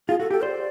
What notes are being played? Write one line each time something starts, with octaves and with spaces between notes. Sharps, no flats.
F4 G#4
F#4 A4
G4 A4
C5 D5